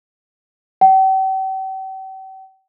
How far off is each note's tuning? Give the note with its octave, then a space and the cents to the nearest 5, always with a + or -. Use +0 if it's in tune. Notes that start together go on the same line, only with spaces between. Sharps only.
G5 -45